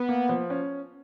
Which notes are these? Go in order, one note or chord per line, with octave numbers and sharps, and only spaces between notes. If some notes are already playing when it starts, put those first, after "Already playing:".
Already playing: B3
A#3
F3
C#4